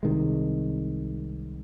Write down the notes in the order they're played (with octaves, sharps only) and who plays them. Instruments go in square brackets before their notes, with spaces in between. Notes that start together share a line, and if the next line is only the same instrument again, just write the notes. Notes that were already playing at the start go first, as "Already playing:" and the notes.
[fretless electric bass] C2 C3 D#3 G#3